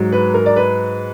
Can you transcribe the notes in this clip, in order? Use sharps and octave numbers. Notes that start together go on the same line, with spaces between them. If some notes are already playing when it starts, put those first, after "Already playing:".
Already playing: G#2 F#3
B4
A#4
D5
B4